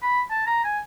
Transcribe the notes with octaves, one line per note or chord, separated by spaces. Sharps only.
B5
A5
A#5
G#5